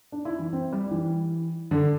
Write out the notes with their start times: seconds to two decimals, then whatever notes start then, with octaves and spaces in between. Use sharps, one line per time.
0.12 D4
0.25 E4
0.39 E3
0.53 C4
0.73 G3
0.86 G3
0.91 E3
1.71 D3